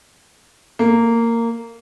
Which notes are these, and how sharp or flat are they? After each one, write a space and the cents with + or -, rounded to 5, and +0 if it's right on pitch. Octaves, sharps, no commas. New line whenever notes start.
A#3 -15